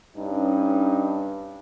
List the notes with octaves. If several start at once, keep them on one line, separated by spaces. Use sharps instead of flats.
G2 C#4 D#4